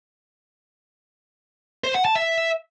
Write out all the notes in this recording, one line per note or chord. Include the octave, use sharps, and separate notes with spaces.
C5
F#5
A5
E5